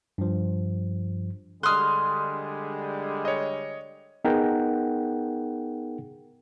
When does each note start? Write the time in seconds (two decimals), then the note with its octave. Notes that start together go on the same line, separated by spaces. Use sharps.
0.18 G2 F3
1.63 D3 G3 G#3 C6 D#6 F6 F#6
3.25 C#5 D#5
4.24 B3 D#4 G#4 A#4 F#5 G5